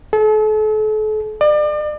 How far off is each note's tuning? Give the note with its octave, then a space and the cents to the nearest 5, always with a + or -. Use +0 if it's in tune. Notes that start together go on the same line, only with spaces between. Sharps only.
A4 -40
D5 +35